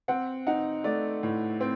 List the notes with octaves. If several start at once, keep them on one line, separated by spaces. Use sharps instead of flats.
C4 F#5
D#4 F#5
A3 D5
A2
C4